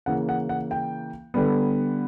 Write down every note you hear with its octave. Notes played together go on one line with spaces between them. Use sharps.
C#3 E3 A#3 F#5
F#5
F#5
G5
D3 G3 B3